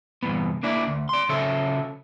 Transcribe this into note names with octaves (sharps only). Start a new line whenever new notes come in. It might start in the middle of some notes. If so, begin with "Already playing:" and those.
C2 G2 E3 B3
A#3 D4 E4 D5
D2
D5 C6
C#3 F#3 A4 C#5 E5